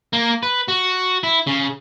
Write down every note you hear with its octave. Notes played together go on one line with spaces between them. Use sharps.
A#3
B4
F#4
E4
C#3